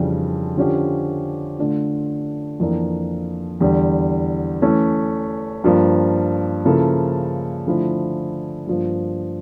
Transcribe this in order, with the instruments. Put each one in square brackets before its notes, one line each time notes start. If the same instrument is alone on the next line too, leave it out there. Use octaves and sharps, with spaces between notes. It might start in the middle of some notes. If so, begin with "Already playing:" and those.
Already playing: [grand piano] F2 C#3 E3 G3 D4
D3 F3 C#4 G4
D3 A3 D4 F4
F2 E3 A#3 D4
E2 D3 G3
E3 A3 C#4
G2 F3 A#3
C#3 F3 A#3 E4 A4
D3 F3 A3 E4
G2 F3 A#3